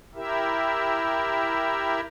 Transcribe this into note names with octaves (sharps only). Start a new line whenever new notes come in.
E4 G4 A#4 E5